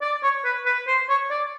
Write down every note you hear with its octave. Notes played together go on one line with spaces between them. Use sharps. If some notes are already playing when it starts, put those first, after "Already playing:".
D5
C#5
B4
B4
C5
C#5
D5